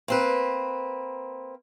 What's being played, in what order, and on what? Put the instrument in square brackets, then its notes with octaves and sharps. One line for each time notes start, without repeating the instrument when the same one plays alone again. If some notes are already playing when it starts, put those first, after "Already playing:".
[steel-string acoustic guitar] A#3 C4 B4